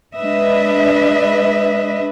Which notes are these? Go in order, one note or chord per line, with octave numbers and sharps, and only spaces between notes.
G#3 D4 B4 D#5 E5